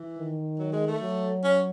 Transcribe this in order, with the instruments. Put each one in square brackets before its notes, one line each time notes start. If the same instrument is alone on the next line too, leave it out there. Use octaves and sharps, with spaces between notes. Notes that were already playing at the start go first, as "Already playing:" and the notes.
Already playing: [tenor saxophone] E3
[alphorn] D#3
[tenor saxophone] F#3
G#3
A3
[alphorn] F#3
[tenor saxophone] C#4